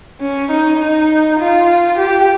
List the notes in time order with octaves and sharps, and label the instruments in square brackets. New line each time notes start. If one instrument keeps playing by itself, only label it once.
[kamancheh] C#4
D#4
D#4
F4
G4